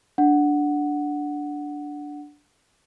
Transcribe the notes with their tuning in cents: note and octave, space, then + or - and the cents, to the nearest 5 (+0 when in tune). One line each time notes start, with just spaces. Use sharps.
D4 +0 F#5 +0